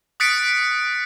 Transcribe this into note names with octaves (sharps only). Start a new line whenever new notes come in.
D#6 F#6 A6 B6 C#7 D7